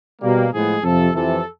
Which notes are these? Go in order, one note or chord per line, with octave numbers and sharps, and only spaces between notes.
B2 G3 A#3
A2 F3 G#3 B3 G#4
F2 C3 F3 A4
F2 C3 E3 A4